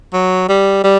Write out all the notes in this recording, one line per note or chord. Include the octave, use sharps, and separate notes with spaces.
F#3
G3
G3